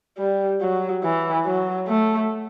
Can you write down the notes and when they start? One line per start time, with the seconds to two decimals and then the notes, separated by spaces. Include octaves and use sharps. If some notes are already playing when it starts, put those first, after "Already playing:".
0.18 G3
0.61 F#3
1.03 E3
1.45 F#3
1.88 A3